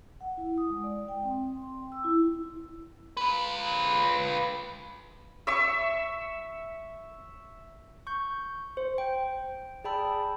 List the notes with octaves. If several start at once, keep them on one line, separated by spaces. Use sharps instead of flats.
F#5
E4
D#6
G#3
D5
G5
C4
C6
G5
E6
E4
F4 B4
E5 C#6 E6
C#6 G6
C5
G5
G#4 D5 G5 A5 B5 E6